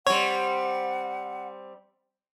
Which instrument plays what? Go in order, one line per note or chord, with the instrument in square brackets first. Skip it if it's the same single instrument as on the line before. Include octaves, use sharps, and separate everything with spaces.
[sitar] G3 C4 [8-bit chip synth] C#5 [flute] F#5